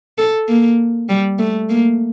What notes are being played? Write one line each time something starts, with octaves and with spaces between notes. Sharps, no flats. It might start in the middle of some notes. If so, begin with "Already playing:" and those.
A4
A#3
G3
A3
A#3